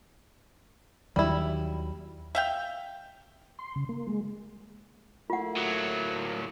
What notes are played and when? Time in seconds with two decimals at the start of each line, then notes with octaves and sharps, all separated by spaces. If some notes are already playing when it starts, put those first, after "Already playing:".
1.16 D#2 D#3 F#3 G3 E4
2.35 E5 F5 G5
3.59 C6
3.76 C#3
3.89 A#3
4.08 G#3
5.30 A3 A#3 E4 F4 F#5
5.56 A2 F#3